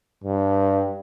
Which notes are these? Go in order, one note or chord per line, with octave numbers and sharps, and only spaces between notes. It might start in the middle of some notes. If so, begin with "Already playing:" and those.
G2